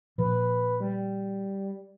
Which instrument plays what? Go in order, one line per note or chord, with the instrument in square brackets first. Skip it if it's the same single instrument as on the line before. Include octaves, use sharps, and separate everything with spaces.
[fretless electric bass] A#2 F3 [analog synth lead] B4
[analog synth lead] G3